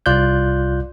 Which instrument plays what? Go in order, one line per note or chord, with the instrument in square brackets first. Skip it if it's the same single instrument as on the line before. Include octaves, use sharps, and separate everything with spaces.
[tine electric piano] C2 F4 D5 F#6 G6